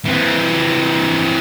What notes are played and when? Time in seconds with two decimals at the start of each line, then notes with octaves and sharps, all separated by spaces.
0.05 E3 C4